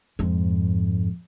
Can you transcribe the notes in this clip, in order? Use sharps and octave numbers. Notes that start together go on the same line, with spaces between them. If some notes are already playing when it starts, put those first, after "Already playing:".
F2 G#2